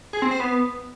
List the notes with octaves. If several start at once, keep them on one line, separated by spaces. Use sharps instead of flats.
G#4
C4
C5
B3